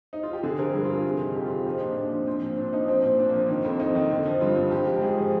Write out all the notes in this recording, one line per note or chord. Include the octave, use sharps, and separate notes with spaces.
D#4
F4
G4
D3 G#4
F3 A#4
G2 G#4
F4
G2
G#4
C3
D#3
F2 G4
F4
F2
F3 D#4
A#2 D4
A#2 D4
F3 C4
F3 C4
A#2
A#2 D4
F3 D#4
F3 C4
A#2
A#2 D4
A#3
F3
C4
D#3
F2 C4
F2 D#4
D#3
D3
F3
G2 F4
G2
F3 G4
G#2
G4
G#2 G#4
F3